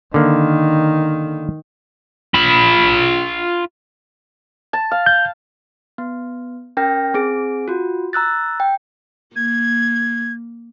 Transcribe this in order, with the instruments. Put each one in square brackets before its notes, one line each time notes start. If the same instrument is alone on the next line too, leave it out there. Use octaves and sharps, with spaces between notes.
[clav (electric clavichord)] D3 A#3 [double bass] D#3
[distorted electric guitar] F4 B5
[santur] A5
F5
[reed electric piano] G6
[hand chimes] B3
C#4 A#4 G5 F6 A#6
C4 G#4 D7
F4 F#4
A#5 E6 F#6 A6
G5
[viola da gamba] A#3 [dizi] G#6